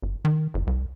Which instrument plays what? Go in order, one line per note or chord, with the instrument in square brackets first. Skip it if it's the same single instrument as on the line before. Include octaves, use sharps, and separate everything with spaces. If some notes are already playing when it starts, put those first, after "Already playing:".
[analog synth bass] G1
D#3
F#1
C2